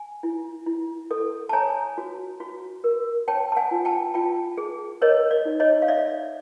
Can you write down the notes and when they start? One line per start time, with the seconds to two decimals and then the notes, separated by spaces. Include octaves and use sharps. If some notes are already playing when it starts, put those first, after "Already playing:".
Already playing: G#5
0.23 E4
0.66 E4
1.11 A4
1.49 A5
1.53 C#5 G#5 A#5
1.98 F#4
2.40 F#4
2.84 A#4
3.28 C#5 G5 A5
3.52 A5
3.56 F#5 G#5
3.71 F4
3.85 G5 A5
4.14 F4 G5 A5
4.58 G#4
5.01 A#4 C#5 D#5
5.31 D5
5.45 D#4
5.60 C#5 D#5
5.82 F5
5.88 C#5 D5 E5